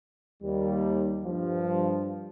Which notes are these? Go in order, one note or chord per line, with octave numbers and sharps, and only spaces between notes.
D#2 G3
G2 F3